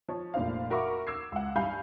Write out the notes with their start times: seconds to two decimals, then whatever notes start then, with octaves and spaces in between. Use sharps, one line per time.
0.09 F3 C#5
0.34 F1 A#2 D4 C5 F5
0.70 F#4 A#4 E5 B5 C#6 D6
1.07 D6 E6 G#6 C7
1.32 C#2 F#5
1.56 G2 F5 G#5 B5 G6 C7